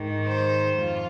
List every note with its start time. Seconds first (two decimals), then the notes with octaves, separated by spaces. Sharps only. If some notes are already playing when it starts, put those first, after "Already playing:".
Already playing: G#2 D#3
0.28 C5
0.79 F2 F4